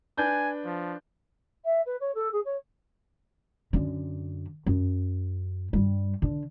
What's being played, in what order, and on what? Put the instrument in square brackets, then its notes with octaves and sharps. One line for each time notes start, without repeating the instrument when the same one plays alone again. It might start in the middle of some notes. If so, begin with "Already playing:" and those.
[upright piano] D4 B4 G6 [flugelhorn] G#5
[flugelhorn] F3
[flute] E5
B4
C#5
A4
G#4
C#5
[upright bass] F#2 D3
F#2
G2 G3
D3